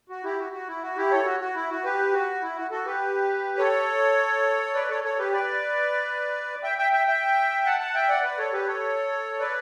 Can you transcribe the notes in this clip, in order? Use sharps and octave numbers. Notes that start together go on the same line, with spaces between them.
F#4
E4 G4
F#4
F#4
E4
F#4
E4 G4
A4 C#5
F#4
F#4
E4
F#4
G4 B4
F#4
E4
F#4
F#4 A4
G4 B4
A4 C#5
B4 D5
A4 C#5
A4 C#5
G4 B4
B4 D5
E5 G5
E5 G5
E5 G5
E5 G5
F#5 A5
F#5 A5
E5 G5
D5 F#5
B4 D5
A4 C#5
G4 B4
A4 C#5
B4 D5